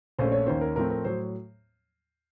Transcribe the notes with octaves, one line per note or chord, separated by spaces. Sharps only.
A#1 A#2 A3 C#4 C5
C#5
D#2 D#3 A#3 C#4 C5
A#4
A2 F3 A3 C4 A#4
A#4
A2 F#3 C5